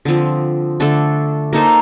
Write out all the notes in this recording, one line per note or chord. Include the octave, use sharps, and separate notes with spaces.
D3 F3 C4
D3 A3 D4 A4
A#3 D#4 A4 C5